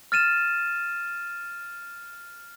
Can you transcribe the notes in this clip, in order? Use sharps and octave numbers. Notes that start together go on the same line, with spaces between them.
F6 A6 D#7 E7